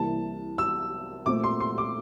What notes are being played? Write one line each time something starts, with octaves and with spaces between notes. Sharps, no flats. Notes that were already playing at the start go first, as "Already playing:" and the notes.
Already playing: C2 C3 E3 A#3 A5
E6
A#2 A3 C4 D6
C6
C6
D6